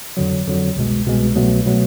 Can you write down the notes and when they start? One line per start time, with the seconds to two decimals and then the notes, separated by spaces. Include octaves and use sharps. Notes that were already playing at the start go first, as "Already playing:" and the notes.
0.17 F2 D3 F#3
0.47 F2 D3 F#3
0.76 C2 B2 G#3
1.06 C2 B2 G#3
1.36 C2 B2 F#3 A3
1.66 B2 F#3 A3